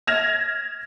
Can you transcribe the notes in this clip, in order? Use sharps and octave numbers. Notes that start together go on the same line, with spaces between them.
F6 G#6 A#6 E7 F7